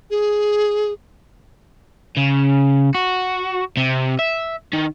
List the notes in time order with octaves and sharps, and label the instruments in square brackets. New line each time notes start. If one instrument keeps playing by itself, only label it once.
[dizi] G#4
[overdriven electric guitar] C#3
F#4
C3
E5
D#3